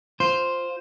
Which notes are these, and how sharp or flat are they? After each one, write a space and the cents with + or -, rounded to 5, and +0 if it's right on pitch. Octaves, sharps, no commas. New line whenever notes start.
F4 +5 C5 +0